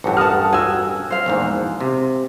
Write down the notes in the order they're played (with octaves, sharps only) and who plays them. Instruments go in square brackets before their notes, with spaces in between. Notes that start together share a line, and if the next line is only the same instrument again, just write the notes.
[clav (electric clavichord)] A1 G2 [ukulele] F#4 A4
[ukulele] A#4 A5 [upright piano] F#5 D#6 F6
[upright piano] F#4 E6 [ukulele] G#5
[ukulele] C5 F5
[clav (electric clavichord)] A#1 E2 G#2
C3